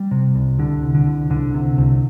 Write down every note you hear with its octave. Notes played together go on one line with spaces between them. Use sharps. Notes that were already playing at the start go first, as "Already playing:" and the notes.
Already playing: G3
C3
C2
C2 D3
C2
D3
C2
C2 D3
C3
C2